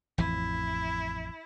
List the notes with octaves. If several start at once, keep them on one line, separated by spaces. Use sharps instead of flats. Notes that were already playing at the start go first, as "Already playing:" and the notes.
A1 F2 E3 E4